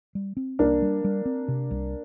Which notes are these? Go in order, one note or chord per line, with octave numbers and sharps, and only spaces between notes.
G3
C4
C2 A#3 D4
G3
G3
C4
C3
C2